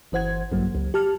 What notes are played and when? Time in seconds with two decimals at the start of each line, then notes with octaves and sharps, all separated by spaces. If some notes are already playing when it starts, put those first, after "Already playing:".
0.12 G1 E3 C5 F#5 G#6
0.52 A#1 G2 F#3 A#3
0.75 C#2
0.94 G4 A5 F6